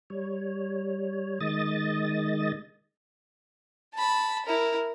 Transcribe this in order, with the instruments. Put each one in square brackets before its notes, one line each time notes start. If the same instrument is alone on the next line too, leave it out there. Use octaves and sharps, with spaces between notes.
[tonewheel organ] G3 C#5
D#3 G#3 D#5 D#6 A6
[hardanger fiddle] A5 B5
E4 A#4